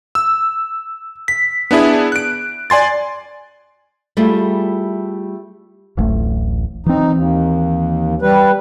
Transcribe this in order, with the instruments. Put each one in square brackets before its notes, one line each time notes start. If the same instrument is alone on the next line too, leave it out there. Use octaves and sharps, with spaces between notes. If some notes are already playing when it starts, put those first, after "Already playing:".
[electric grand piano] E6
B6
B3 D4 E4 G#4
F#6 D7
D5 G#5 C6 A6
[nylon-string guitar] G3 A3 E4 F4 G#4
[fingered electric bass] D1 A1 A3
[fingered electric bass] E3 C4 [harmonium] D#4
[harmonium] D#2
G3 B4